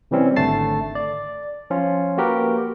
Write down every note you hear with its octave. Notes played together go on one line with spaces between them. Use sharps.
C3 E3 G3 C4 C#4
G#1 D3 A3 A5 A6 C7
D5
F3 C#4 F4
A#3 F#4 G4 A#4 B4